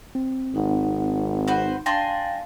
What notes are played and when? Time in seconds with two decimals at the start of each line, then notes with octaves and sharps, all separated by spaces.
0.15 C4
0.55 G#1 D#4 F#5
1.48 F#4 B4 C5
1.86 D4 F5 G5 G#5 C6 A#6